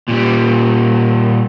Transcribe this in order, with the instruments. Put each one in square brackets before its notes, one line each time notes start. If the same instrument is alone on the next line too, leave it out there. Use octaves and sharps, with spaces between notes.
[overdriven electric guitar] A#2 G3